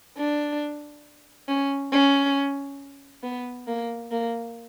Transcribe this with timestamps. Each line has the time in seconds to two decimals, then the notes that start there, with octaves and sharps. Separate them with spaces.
0.18 D4
1.48 C#4
1.92 C#4
3.23 B3
3.67 A#3
4.11 A#3